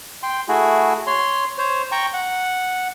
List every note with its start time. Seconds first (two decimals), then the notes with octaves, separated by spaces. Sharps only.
0.23 G5 C6
0.48 A3 E4 F#4 G#4
1.07 C#5 C6
1.58 C5 C#5
1.92 G5 A#5 C#6
2.13 F#5